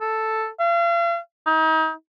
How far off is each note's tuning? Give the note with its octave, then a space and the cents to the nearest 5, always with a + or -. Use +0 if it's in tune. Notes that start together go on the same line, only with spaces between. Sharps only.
A4 +0
F5 -40
D#4 +35